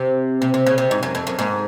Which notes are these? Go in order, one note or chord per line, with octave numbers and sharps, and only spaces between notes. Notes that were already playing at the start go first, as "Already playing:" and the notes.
Already playing: C3
C3
C3
C#3
C3
G#2
F#2
F2
F#2
G#2